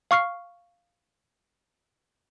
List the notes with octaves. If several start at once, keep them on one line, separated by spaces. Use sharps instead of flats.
F5 C#6 F6 C7